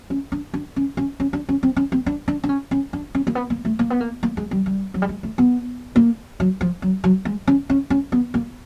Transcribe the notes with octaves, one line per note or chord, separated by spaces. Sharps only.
C#4
D4
D4
C#4
C#4
C#4
D4
C#4
C4
C#4
C4
D4
D4
D4
C#4
C#4
D4
C#4
A#3
B3
A#3
A3
A#3
B3
A#3
A#3
G#3
G3
G3
F#3
G3
G#3
A3
B3
A#3
F#3
F3
F#3
F#3
G#3
C#4
C#4
C#4
B3
A#3